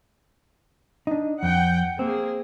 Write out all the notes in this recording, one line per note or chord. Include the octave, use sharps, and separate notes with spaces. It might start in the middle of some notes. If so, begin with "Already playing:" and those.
D4 D#4
F2 F#5 G5
A#3 C4 G#4